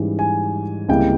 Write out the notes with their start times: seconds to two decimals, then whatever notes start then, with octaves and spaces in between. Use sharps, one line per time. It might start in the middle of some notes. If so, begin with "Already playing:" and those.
Already playing: G#2 E3 G3 C#4 E4
0.19 G#5
0.88 C#2 C3 G3 A#3 E4 G5